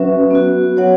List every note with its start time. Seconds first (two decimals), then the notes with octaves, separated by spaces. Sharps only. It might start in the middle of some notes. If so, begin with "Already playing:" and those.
Already playing: F#3 C#4 F#4 B4 E5
0.31 B3 F#4
0.77 F#3 B3 C#5 F#5